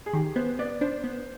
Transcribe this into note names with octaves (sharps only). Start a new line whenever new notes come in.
G#4
D#3 G4
B3 C5
B3 D5
D4 C5
B3